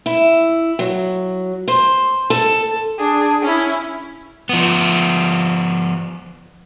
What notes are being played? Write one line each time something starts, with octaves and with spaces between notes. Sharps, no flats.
E4
F#3
C5
A4
D4 G#4
C#4 E4
F3 B3